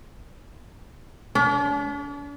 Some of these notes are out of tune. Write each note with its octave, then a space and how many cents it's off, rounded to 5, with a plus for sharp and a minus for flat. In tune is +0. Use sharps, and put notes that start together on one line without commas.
D4 -45